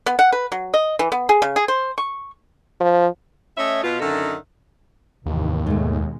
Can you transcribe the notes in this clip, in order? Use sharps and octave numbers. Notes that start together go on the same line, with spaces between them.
B3
F#5
B4
F#3
D#5
E3
B3
G#4
C#3
G#4
C5
C#6
F3
A3 C#4 C#5 D#5 E5
B2 F4
F#2 D3 D#3 D#4 A4 E5
F1 D#2 G#2 E3
G#2 B2 D#3 G#3 A3